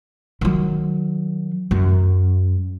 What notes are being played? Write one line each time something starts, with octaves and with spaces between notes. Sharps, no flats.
D#3 F#3
F#2